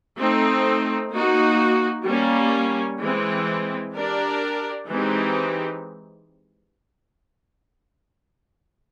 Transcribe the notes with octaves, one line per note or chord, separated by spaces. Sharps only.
A3 C4 D#4
A#3 D#4 F#4
G3 A#3 C#4
E3 G#3 C4
D4 G4 A#4 D5
E3 G#3 C4 D#4 G4